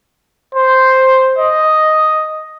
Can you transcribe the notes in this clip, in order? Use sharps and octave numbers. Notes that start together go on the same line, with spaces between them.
C5
D#5